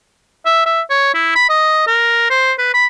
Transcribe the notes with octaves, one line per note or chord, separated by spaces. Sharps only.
E5
E5
C#5
E4
B5
D#5
A#4
C5
B4
B5